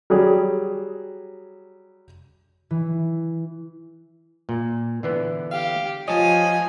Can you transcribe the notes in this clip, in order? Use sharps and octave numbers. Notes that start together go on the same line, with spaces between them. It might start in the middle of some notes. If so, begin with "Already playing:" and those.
F#3 G3 G#4
E3
A#2
D3 E3 B3
G4 F5
F3 C#5 D#5 G#5 A5